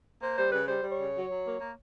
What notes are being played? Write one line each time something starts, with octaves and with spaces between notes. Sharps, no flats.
A#3 C5
G3 C5
C#3 B4
G3 C5
G3
C#5
C#3
F#3
F#3
A#3
A#3